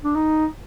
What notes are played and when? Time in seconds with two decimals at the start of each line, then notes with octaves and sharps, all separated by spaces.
0.04 D4
0.16 D#4